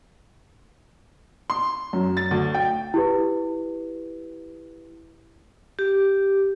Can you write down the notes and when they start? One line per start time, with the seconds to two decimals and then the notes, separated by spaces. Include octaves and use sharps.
1.50 C6
1.93 F#2
2.17 A6
2.31 D2
2.54 G5
2.94 E4 G4 B4
5.79 G4